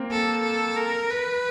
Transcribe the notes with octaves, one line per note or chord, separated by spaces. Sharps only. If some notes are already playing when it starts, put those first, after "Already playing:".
Already playing: A#3 C4
A4
A4
A#4
B4